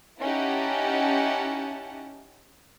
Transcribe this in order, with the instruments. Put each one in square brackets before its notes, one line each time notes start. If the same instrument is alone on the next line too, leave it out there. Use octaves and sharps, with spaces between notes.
[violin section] C#4 D#4 E4 G4 F#5 A5